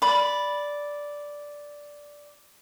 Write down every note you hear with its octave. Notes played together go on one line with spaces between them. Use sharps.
D5 B5